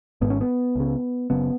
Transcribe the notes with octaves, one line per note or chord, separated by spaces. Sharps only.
G#1 G#2 B3
C#4
B3
C#2 C#3
F#1 F#2 C#3 B3